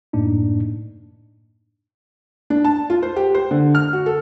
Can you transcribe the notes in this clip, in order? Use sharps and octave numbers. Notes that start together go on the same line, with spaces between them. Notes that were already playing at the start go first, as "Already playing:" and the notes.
F#2 A2 A#3 D4 D#4
D4
A5
F4
C5
G4
C5
D3
F6
F#4
A4